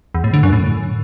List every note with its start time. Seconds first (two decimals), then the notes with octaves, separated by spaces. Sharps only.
0.15 E2
0.24 A2
0.34 D3
0.43 F#2
0.53 A2